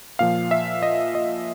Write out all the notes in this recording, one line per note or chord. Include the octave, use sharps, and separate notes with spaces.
A#2 F3 F5
E5
D#5
D#5